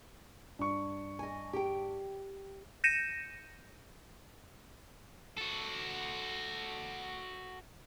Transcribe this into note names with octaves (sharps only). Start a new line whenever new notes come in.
G2 C#6
D#5 G#5
G4 G5
G6 A#6 C#7 D#7 E7
F#4 A4